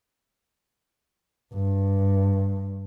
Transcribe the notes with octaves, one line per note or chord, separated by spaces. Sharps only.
G2